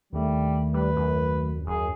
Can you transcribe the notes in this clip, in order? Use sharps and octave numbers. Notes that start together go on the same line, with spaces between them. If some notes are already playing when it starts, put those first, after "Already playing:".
D#2 D#3 G3 A3 D4
G3 B4
F#2
F#2 G#4